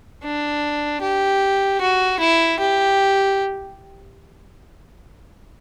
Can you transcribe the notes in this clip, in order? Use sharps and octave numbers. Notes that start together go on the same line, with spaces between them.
D4
G4
F#4
E4
G4